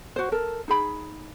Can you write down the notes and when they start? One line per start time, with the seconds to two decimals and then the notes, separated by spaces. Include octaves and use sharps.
0.16 F#4 C5
0.32 A4 A#4
0.68 D#4 G#4 B5